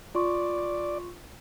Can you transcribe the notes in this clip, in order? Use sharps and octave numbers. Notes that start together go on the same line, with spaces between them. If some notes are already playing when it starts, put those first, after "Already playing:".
F4 D5 C6 C#6